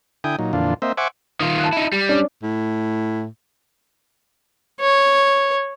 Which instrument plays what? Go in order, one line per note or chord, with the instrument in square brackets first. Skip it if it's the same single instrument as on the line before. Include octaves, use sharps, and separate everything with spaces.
[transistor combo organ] D3 E4 G5 G#5 D#6
A#2 F#3 D#4
F2 A#2 D3 E3 D4 F4
A#3 C4 C5 D#5 E5
C5 E5 F#5 G#5 C#6 D6
[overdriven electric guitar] D#3 F4
[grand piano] A5 F#6
[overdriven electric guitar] D#4 E4
G3
[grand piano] C#4 D4
[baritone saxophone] A2
[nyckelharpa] C#5